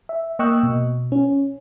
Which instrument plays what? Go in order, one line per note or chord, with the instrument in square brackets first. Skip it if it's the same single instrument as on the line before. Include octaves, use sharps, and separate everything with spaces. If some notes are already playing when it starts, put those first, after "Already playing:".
[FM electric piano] E5
A#3 D#5 G5 C#6 E6 F#6
B2
C#4